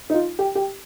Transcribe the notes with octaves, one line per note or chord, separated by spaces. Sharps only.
D#4
F4
G4
G4